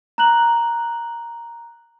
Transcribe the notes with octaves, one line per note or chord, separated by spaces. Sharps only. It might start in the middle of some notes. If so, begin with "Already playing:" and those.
A#5 F#6 F#7